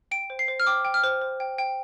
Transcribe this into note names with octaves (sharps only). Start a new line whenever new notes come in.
G5 D7
C5
C7
C5
F6
G5 D6
G5
F6
C5
C5
G5
G5